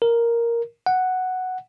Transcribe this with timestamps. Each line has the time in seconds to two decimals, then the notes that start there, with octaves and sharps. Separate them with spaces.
0.02 A#4
0.86 F#5